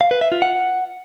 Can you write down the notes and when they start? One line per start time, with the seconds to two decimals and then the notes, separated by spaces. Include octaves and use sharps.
0.01 F5
0.11 B4
0.21 E5
0.32 F4
0.42 F#5